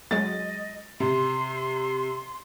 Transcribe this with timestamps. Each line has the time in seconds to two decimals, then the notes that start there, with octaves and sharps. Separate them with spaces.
0.11 F#3 G#3 D#5 A6
1.00 C3 C6